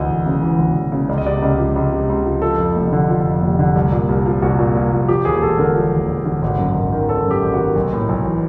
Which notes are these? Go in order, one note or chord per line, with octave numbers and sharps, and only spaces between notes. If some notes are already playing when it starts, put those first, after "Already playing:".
Already playing: D2 E3 D#5
E1
C#3
E3
D2
E1
C#3
C#2 D5
D#5
C3 D5
C#2
F3
C#2
C3
C#2
F3
F3 A4
F2
F1
D3
F3
F2
F1
D3
C2
A#2
C2
F3
C2 F#4
A#2
C2
F3
F3 G4
D#2 G#4
E1 A4
D3 A#4
F3
D#2
E1
D3
G#1
F#2
G#1
D#3
G#1 A4
F#2
G4
G#1
F#4
D#3
B1
A2
B1
E3